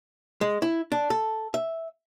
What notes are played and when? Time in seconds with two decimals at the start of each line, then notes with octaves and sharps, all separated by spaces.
0.41 G#3
0.62 E4
0.92 D4
1.10 A4
1.54 E5